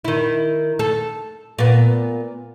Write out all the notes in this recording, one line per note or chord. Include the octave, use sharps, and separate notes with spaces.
D#3 E4
A4
A#2 B3